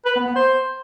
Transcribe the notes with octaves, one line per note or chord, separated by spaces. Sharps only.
B4
B3
B3
C5